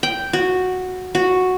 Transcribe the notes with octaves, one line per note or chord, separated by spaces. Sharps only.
G5
F#4
F#4